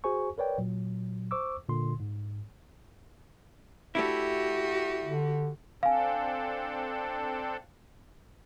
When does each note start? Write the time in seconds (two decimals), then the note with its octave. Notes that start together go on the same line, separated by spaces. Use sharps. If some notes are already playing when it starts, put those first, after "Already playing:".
0.04 F#4 G#4 C5 G#5 C#6
0.38 A#4 B4 C#5 D5 G5
0.58 A#2 F#3
1.31 C5 C#6 D6 E6
1.68 A#2 D3 C6
2.00 G#2
3.95 A3 D4 E4 F#4 G4
5.05 D3
5.83 C4 D4 A4 F5 G#5